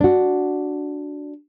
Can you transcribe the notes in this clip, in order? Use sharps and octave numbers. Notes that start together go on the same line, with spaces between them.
D4 F#4